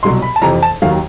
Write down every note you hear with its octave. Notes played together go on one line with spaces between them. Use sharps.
C2 B2 F#3 C6
B5
A5
F2 C3 E3 A#5
A5
D#2 D#3 F#3 F5